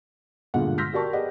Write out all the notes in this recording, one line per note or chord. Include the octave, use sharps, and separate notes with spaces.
E1 G2 A#2 D3 G#3 F#5
C6 E6 F6 G6 A#6 B6
F#4 G4 A#4 D5 A5 C#6
G4 G#4 B4 D5 D#5 F#5